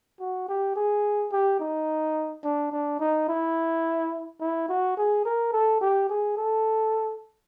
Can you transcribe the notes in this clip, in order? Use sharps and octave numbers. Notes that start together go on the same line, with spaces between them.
F#4
G4
G#4
G4
D#4
D4
D4
D#4
E4
E4
F#4
G#4
A#4
A4
G4
G#4
A4